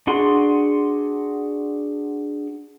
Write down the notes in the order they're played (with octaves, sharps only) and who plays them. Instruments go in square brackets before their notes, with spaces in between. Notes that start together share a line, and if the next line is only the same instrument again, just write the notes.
[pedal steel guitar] D4 F#4 G#4 F#5 C6